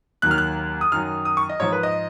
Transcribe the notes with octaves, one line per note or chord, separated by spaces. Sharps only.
D#2 D#3 F#3 F#6
F6
F#6
D#6
F#2 D#3 F#3 F6
D#6
C#6
D#5
G#2 F3 C#5
B4
D#5